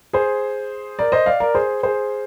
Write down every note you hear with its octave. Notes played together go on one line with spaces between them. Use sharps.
G#4 C5
A#4 D5
C5 D#5
D5 F5
A#4 D5
G#4 C5
G#4 C5